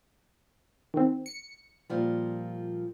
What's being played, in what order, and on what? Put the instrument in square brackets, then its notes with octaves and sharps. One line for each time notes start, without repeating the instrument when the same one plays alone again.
[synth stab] D#3 C4
C#7
[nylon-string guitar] A#2 F3 G3